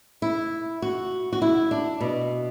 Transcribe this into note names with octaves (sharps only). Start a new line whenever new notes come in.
E4
F#4
F#4
E4
D4
B2